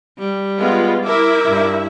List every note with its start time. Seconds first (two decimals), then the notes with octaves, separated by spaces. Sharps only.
0.18 G3
0.59 G#3 B3 F4
1.05 E4 A#4 E5 D6
1.46 G2